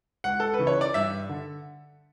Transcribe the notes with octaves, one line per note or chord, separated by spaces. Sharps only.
C#2 F#5
A4
B4
C#3 E3
C#5
D5
G2 E5
D3